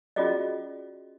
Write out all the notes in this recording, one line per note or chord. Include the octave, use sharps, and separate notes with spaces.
C#4 F4 F#4 G#4 D5 D#5